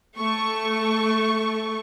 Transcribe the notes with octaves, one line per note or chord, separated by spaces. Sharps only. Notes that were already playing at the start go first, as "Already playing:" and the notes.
A3 C#6